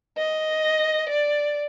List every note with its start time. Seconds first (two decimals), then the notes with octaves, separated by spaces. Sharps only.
0.18 D#5
1.09 D5